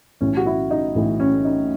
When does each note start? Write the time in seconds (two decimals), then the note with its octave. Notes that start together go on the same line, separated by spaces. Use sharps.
0.21 B1 A2 E3 C#4
0.37 F#4
0.46 E4
0.71 D#4
0.95 B1 A2 E3
1.20 C#4
1.45 D#4